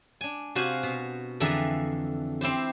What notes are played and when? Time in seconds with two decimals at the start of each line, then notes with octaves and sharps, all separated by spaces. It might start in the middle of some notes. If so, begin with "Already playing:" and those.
0.21 D4 G#5
0.55 C3 F#4 C5 F5 G#5
0.83 B2
1.40 F2 D3 E3 G#4 E5 A#5
2.41 C4 E4 G4 C5